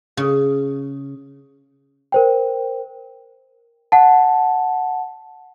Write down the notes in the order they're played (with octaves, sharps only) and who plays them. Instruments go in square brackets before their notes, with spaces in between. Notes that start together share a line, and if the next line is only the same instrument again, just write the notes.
[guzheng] C#3
[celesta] A#4 C5 G5
F#5 A5